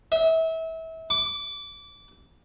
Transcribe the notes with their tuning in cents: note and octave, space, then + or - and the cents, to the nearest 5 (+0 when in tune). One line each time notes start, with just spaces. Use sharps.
E5 -30
D6 -25